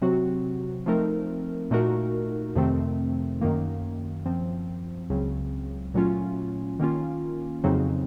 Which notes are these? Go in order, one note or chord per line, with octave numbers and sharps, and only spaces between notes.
C3 F#3 C4 F#4
F3 A3 C4 D#4 A#4
A#2 A3 D#4 F#4 A#4
F2 C3 D#3 A3 C4
F#2 D#3 A#3
F#2 F3 C4
C#2 C#3 F#3 C4
A#2 F#3 A3 C#4 F4
D#3 A#3 C#4 F4
F2 C#3 F#3 C4 D#4